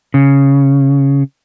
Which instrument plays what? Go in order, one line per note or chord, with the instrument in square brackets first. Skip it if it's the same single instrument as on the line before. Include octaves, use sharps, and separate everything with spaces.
[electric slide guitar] C#3